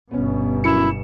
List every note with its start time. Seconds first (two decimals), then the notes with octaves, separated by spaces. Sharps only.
0.11 G1 B2 B3 C#4
0.64 F#2 E4 C#7 E7